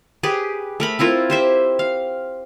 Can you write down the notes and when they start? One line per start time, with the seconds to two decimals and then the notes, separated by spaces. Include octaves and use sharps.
0.23 G4 G#4 B4
0.80 A3 A#4 B5
0.99 C4 E4 F4 A#4
1.30 G4 C5 E5
1.79 F5